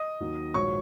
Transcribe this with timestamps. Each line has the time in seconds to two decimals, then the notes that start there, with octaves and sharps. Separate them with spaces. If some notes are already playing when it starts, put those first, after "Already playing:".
Already playing: D#5 D#6
0.20 D#2 D#3 F#3
0.54 A#1 G#2 D#3 F#3 C#5 C#6